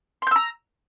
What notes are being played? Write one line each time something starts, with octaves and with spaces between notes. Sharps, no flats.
A#5 C6 E6 G6